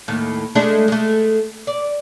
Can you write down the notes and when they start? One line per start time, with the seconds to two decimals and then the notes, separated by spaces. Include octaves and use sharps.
0.08 D#2 A2
0.55 G#3 A3 D4
0.88 G#3 A3
1.67 D5